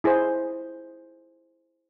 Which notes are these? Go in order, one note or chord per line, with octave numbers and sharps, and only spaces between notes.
E4 G#4 C5